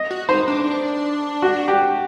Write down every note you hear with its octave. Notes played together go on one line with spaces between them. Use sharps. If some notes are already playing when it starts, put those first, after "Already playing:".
Already playing: D#5
F#4
D#4 C5
D4
F#4
G4